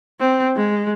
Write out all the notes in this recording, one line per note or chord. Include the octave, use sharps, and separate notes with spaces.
C4
G#3